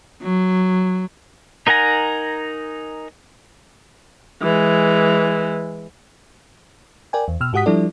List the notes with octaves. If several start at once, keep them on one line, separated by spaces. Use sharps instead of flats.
F#3
D#4 A#4 F#5 G#5 A#5
E3 G#3
A#4 D5 G5 G#5
E2
B2 E6 F6
G#2 F#4 G4 F#5 D#6 B6
F3 G3 D4 E4 A4 D5